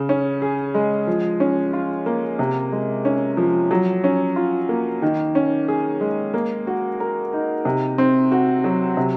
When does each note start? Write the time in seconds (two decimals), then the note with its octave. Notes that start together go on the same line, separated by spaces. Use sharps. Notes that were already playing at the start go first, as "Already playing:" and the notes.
Already playing: C#3
0.09 C#4
0.42 G#4
0.74 G#3
1.07 F3
1.40 C#4
1.73 F4
2.06 A#3
2.39 C3
2.72 G#3
3.05 C#4
3.37 F3
3.71 F#3
4.04 C#4
4.36 F4
4.69 A#3
5.02 D#3
5.35 C#4
5.68 G#4
6.01 G#3
6.34 A#3
6.67 F#4
7.00 A#4
7.33 D#4
7.65 C3
7.98 C4
8.32 F#4
8.64 F#3
8.97 C3